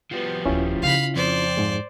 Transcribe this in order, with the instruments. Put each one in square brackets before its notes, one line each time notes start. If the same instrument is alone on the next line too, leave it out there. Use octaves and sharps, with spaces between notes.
[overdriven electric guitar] F3 G3 [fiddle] B3
[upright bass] D#1 D#2 [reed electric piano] C#4 E4 F4
[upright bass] C#3 D#4 [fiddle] F5 B5
[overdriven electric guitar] F2 [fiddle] C5 D5
[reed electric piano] G#2 G#3